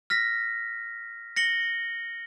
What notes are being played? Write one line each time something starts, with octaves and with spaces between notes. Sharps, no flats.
F6 A#6 B6
A#6 C#7 F#7 G7